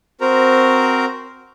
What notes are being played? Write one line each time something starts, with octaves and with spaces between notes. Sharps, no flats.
C4 F#4 A#4 C5 A#5